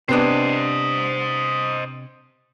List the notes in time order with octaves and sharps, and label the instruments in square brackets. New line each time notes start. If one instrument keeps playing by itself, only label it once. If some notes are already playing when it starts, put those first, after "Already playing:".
[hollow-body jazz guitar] C3 B3 D4 [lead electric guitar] C5 D#5